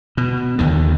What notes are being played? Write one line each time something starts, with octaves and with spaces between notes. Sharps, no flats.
B2
D#2 D3 D#3